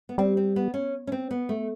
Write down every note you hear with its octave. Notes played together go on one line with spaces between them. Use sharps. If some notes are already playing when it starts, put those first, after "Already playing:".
B3
G3 C4
C4
B3
C#4
C#4
C4
B3
A3